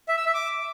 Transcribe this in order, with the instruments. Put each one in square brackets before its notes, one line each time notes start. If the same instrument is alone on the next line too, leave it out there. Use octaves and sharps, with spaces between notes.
[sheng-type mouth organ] E5
E6
E5
D6